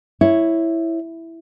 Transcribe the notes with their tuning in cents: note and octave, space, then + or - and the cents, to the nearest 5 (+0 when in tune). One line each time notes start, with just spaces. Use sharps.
E4 +0 C#5 -5